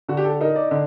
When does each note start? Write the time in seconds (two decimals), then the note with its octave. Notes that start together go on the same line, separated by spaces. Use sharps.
0.09 D3 F#4
0.17 G4
0.24 A4
0.41 D#4 A#4
0.56 D5
0.71 D3